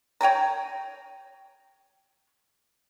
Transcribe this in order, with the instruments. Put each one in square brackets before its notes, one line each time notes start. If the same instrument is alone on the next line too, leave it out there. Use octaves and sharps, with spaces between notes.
[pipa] C#5 G5 G#5 A#5